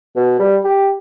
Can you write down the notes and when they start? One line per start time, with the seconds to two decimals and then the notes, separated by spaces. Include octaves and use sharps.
0.16 B2
0.39 G3
0.64 G4